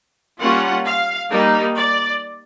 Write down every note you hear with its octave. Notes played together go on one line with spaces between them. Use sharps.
G3 A#3 C#4 F4 F#5
F5
G3 A#3 D#4
D5